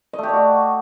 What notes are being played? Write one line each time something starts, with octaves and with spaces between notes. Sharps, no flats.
D#5
A3
G4
D5
F#4